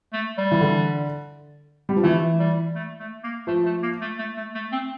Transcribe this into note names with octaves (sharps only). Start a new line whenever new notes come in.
A3
G3
E3
D3
G3
F3
E3 A3
G3
A3
A3
A#3
F3 A3
A3
A#3
A3
A3
A3
A3
C4